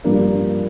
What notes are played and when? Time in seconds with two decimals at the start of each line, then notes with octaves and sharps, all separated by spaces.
0.04 G2 F3 A#3 D4